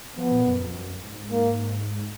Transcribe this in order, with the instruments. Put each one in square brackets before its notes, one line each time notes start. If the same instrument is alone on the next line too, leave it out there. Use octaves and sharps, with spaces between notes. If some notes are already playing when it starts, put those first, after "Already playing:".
[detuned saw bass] F3 [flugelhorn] B3
[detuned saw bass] A#2
F#2
F2
F#2
G#2
[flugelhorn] A#3